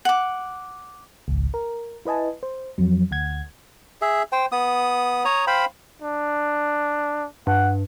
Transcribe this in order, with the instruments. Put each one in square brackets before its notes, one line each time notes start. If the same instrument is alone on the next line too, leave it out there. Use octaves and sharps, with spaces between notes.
[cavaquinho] F#5 D6
[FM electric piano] G#1 C#2
A#4
E4 B4 D#5 G#5 A5
C5
F2 F#3
D2 F#5 G#6
[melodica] G#4 E5
C5 G5
B3 D#6
C#5 A#5 D#6
C5 F5 G5 B5
[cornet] D4
[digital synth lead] G2 [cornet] F#5